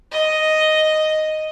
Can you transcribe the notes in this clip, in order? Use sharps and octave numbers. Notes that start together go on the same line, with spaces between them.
D#5